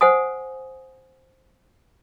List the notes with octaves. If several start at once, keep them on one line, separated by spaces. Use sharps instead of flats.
C5 F#5 G#5 D#6